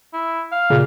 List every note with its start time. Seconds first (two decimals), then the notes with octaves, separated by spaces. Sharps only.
0.13 E4
0.52 F5
0.70 A#2 C#3